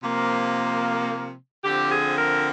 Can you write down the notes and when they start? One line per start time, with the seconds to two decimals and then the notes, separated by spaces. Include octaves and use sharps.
0.03 C3 F3 A#3
1.64 D3 F3 C4 G4
1.91 G#4
2.18 A#4